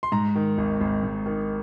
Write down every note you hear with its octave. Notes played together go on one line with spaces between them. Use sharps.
C6
G#2 A#5
D#3
G#1
G#1
G#2
D#3